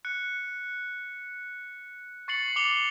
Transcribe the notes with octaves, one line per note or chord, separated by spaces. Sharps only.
F#6 C#7
C#6 A6 C7 C#7 F#7
D6 C#7 F7 G7